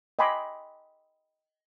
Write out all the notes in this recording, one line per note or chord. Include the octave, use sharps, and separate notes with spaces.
D#5 G5 G#5 B5 C6 D6